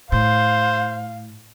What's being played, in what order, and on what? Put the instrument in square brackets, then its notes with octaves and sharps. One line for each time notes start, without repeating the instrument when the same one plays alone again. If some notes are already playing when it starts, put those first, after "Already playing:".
[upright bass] A2 [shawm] C5 [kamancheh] F5